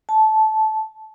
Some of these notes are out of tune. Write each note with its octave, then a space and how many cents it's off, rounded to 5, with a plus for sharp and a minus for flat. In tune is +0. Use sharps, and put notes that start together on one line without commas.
A5 -15